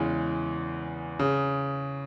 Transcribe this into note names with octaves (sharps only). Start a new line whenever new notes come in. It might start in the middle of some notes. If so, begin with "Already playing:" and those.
Already playing: E2 C#3 E3 G#3
C#3